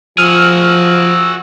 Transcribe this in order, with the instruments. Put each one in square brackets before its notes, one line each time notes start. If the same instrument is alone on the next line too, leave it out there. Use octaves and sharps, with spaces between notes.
[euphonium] F3 [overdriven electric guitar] F#4 G#4 [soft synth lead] E6 [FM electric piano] F6